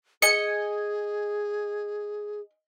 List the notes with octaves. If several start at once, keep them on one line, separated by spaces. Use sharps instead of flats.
G#4 D#5 G#5 C#7